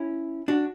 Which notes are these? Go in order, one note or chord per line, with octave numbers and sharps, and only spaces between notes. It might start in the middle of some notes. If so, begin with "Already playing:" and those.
Already playing: C#4 E4
D4 F#4